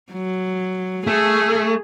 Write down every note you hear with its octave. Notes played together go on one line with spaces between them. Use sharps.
F#3
A3 G#4